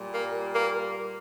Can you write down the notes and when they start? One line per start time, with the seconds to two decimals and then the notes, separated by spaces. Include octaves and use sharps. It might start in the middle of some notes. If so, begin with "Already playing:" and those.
Already playing: A#2 G3
0.14 A#3
0.55 A#3